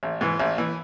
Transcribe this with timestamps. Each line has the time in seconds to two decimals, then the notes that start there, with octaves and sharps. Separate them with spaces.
0.03 A1
0.21 G#2 E3
0.40 A1
0.58 E3